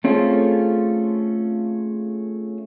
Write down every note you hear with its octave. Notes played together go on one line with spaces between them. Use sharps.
A3 C4 C#4 F4 G#4 A4